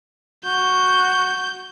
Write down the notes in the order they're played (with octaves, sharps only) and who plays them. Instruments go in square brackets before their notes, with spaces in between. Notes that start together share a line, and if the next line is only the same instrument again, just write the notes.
[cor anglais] F#4 [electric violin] G6